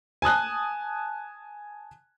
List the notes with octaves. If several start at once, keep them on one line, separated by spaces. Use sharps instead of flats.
G#5 A5 D#6 F#6